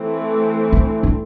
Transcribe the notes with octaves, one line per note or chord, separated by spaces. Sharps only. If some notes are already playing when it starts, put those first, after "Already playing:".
Already playing: E3 A3 C4
D4
D4